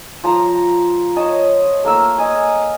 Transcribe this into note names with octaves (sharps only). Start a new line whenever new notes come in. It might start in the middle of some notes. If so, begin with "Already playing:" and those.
F3 A5 A#5
C#5 D#5 A5
A3 A#3 A#4 E6
D#5 G#5